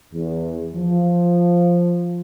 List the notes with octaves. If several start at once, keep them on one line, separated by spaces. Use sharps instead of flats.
E2
F3